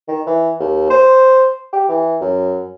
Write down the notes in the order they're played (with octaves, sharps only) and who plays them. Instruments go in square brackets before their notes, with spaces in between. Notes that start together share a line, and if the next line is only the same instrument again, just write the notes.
[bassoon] D#3
E3
D#2
C5
G4
E3
F#2